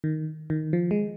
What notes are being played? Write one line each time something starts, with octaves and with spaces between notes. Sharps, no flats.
D#3
D#3
F3
G#3